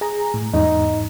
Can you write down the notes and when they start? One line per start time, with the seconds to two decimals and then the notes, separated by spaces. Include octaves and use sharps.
0.01 G#4 A#5
0.34 A2
0.53 E2 G#2 D#4